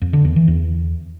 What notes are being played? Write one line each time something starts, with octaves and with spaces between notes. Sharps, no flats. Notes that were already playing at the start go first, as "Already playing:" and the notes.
F2
D3
E2
E3
E2